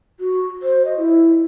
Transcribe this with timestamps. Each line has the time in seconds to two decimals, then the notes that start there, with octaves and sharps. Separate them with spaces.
0.20 F#4
0.62 C5
0.85 D#5
0.98 E4